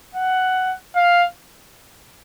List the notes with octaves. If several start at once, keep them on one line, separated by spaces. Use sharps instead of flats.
F#5
F5